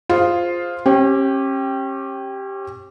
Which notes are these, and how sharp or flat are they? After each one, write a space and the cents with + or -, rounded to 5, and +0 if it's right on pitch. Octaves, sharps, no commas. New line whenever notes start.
F4 +0 G#4 +0 C5 +0
C#4 -35 G4 -5